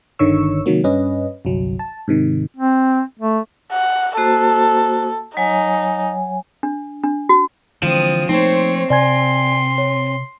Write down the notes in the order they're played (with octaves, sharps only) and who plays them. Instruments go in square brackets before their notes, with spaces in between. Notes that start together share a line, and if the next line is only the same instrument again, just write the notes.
[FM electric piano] G1 D3 D#3 C#5 C#6 E6
C3 D#3 F#3 A#3
G2 C#4 B4 D#5
G1 C2 F#3
A5
G#2 C3 D#3
[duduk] C4
A3
[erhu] F#5
[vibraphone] A#3 F#4 C5 [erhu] A4
[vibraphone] F#3 C#5 G#5 [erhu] D#4
[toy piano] D4
D4
F#4
[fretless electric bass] D3 E3 G#3 [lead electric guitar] F3 [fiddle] C4 D#6
[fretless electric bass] F3 A3 A#3 [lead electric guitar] C4 [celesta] D#4 [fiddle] C5 C#5
[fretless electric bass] C3 [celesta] D5 G#5 G#6 [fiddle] C6
[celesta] C#5